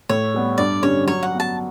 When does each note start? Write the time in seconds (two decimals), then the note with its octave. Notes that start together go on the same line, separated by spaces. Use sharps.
0.09 A2 C#5
0.34 G3 B3
0.58 G2 D5
0.83 D3 G3 C#4 G4 C#5
1.06 F#3 C#5
1.23 F#5
1.32 B3 F#4
1.40 A5